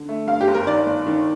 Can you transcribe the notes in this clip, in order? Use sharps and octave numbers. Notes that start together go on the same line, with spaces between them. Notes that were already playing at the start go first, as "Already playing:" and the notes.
Already playing: D3
A3
G2 F5
G4
G1
A#4
D#3 D5
G1
D#3